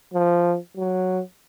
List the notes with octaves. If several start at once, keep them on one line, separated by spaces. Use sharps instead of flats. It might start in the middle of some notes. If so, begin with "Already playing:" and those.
F3
F#3